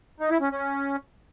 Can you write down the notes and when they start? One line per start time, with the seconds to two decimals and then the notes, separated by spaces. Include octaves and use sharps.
0.20 D#4
0.31 E4
0.41 C#4
0.51 C#4